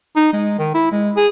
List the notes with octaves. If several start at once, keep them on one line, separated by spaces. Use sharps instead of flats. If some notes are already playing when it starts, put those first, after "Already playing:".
D#4
G#3
D#3
E4
G#3
G#4